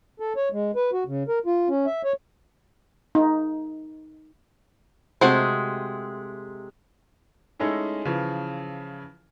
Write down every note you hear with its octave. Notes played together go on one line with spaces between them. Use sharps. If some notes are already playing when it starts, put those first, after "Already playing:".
A4
C#5
G#3
B4
F#4
C#3
A#4
F4
C#4
E5
C#5
D#4
C3 G#3 A3 F#4 C5
G#3 A3 C#4 D#4 E4
C#3 E3 F3